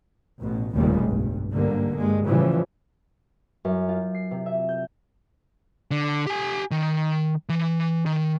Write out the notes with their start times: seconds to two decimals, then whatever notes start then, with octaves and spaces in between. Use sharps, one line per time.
0.39 A1 B2
0.73 F1 D#2 A#2 C#3 G3 G#3
1.05 B1 G2
1.49 G#2 D3 G3 A#3
1.95 G2 G#3
2.26 A2 C#3 E3 F3 G3
3.65 F#2
3.89 F4
4.15 C7
4.31 C3
4.46 E5
4.69 G6
5.91 D3
6.27 G4 G#5
6.71 D#3
7.49 E3
8.06 D#3